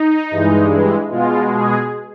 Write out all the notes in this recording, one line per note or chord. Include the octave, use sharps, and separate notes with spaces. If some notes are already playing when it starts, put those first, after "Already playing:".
Already playing: D#4
G2 E3 G#3
B2 G#3 F4
G#4